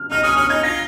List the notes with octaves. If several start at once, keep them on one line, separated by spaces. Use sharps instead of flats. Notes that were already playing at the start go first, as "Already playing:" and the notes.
Already playing: F6
D#4 F6
C#4 D#6
C#4 F6
D#4 G#6
F4 A#6